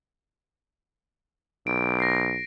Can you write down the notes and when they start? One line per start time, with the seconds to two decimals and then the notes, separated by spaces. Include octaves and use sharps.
1.67 B1 D7
2.00 A#6 C7